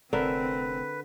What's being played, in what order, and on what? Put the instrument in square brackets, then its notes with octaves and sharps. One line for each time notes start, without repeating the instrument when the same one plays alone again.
[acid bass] F1 [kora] D3 A#4 E5 [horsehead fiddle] C4 [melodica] B4